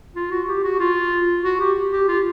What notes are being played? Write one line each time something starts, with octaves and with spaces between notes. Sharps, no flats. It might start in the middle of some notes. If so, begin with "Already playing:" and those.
F4
F#4
G4
F#4
F4
F#4
G4
G4
F4